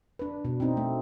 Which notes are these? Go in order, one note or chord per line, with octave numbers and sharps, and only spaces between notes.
D4 B4
B2
C4 D#4
A3